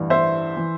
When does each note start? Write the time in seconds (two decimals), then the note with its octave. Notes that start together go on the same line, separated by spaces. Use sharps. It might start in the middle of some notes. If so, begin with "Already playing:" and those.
Already playing: A1 G2 E3
0.10 C5 E5
0.57 E3